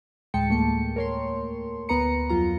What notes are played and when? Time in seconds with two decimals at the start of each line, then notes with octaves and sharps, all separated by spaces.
0.34 D2 A2 G#3 G5 A5 C#7
0.49 E2 A3 A#3 C#7
0.96 A#4 C#5 C6
1.89 D2 B3 B4 A#5 C#7
2.30 F2 F#3 F4 A#5